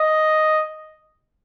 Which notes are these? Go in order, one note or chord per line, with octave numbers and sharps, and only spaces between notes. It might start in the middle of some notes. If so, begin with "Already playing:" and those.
Already playing: D#5